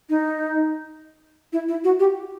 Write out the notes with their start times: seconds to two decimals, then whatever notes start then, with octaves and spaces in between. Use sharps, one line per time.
0.10 D#4
1.53 E4
1.68 E4
1.84 F#4
1.99 G4